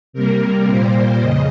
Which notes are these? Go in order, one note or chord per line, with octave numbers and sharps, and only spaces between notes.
C3 G3 A#3 A#4
A#2 G3 A#3 C5
F2 C#3 D#5